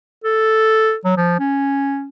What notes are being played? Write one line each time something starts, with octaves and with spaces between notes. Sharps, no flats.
A4
F#3
F3
C#4